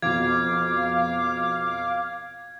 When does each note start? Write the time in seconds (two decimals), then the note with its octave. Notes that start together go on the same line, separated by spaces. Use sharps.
0.02 F2 B2 F5 D6 G#6